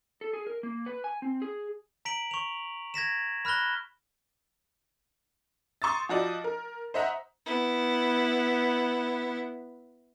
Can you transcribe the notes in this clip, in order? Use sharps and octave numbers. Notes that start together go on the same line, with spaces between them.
A4
G#4
A#4
A#3
B4
G#5
C4
G#4
A#5 B6 D7 F#7
C#6 F7
G#6 A#6 B6 E7
B5 F6 F#6 A#6 G7
C6 C#6 D#6 E6 A6
F3 F#4 D5 D#5
A#4
C5 D#5 E5 F#5 A#5
B3 E4